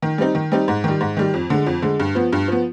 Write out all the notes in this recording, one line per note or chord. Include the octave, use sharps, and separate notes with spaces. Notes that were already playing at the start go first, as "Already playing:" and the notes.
D#3
G3 C4 D#4
D#3
G3 C4 D#4
G#2
D#3 G3
G#2
D#3 G3
F2
D3 G#3
F2
D3 G#3
G2
F3 B3
G2
F3 B3